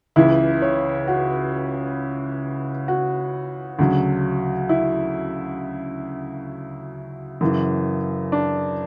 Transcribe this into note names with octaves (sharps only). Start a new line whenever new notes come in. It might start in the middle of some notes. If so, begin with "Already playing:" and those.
C#2 C#3 E3 E4
C#5
F#4
F#4
D2 C#3 F#3
E4
F#2 C#3 E3
D4